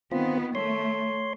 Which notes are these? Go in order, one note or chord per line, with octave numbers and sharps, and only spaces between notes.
D#3 B3 C4 F4
A3 C#5 C6